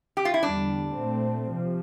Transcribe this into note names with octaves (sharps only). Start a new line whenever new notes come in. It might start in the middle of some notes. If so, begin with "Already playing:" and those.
G4
F4
E4
E2 D3 G3 D4
A#2 A3 C4
C3 F3